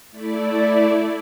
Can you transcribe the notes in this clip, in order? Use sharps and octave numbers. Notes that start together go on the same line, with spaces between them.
A3 E4 D5